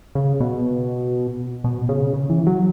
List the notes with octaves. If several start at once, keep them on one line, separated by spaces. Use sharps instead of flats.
C#3
B2
B2
C#3
C#3
E3
F#3